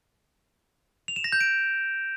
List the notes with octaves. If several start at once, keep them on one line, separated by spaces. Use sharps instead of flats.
F7
E7
A#6
G6
D7